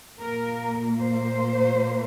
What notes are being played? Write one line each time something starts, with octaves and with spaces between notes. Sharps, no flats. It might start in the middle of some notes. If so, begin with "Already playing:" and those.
A#2 A#3 A#4
C5